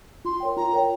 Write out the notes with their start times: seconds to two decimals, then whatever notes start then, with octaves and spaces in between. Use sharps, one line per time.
0.25 F4 C6
0.40 A#4 C#5 G5
0.57 F4 A#5
0.72 A#4 C#5 G5